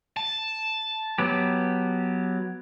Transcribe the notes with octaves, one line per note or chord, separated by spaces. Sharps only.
A5
F#3 B3 G4